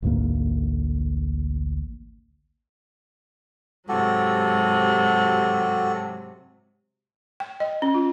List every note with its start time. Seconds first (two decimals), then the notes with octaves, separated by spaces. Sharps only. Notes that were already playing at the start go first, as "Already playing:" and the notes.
0.02 A1 D2 G#2 A#3
3.89 G#2 C3 F#3 F#4 G4 A4
7.40 G5
7.60 D#5
7.82 C#4
7.94 F4